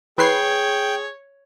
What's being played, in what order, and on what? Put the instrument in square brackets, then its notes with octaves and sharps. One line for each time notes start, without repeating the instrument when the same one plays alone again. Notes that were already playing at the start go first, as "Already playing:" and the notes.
[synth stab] E3 B4 C7 [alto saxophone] G#4 [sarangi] C#5 [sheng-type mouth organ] G5